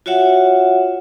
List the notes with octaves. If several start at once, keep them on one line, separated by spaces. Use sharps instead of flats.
F4 F#4 C#5 E5 F#5